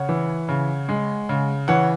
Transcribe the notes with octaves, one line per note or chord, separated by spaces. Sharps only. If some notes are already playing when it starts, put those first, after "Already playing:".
Already playing: C#3 C#5 F#5
E3
C#3
G#3
C#3
E3 C#5 F#5